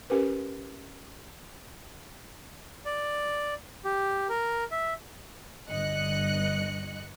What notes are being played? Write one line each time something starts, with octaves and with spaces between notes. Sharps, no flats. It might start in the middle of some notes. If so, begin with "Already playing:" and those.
C#4 G4 A#4 B4
D5
G4
A#4
E5
G1 G2 D#5 F#6 C#7